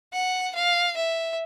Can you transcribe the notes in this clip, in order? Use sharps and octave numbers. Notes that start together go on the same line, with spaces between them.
F#5
F5
E5